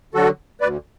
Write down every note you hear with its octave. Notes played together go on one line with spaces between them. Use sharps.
D3 F#3 F#4 A4
D2 B4 D5